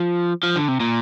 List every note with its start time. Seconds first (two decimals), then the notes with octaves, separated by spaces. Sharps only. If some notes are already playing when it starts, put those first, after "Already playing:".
Already playing: F3
0.43 F3
0.56 D3
0.68 C3
0.80 A#2